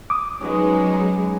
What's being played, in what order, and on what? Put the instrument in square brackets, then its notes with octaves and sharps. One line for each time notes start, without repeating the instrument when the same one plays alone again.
[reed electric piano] D6 D#6
[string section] F#3 G#3 D#4 [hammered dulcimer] C#4 G#4 B4